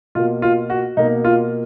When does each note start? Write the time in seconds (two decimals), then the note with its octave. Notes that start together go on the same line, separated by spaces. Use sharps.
0.15 B2 A#3 F4
0.42 F4
0.70 F#4
0.97 B2 A#3 D#4
1.24 F4